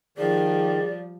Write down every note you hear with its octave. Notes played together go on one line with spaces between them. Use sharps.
D#3 F3 G3 G#4 D5